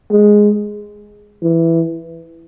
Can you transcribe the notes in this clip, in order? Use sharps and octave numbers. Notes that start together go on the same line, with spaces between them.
G#3
E3